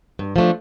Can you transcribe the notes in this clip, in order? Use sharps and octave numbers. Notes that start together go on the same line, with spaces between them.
G2
F3 A3 D4